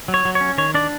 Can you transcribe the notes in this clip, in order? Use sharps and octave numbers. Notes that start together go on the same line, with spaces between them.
F#3
C#5
F#3
C#5
C#4
D#3 C#5
D4 D5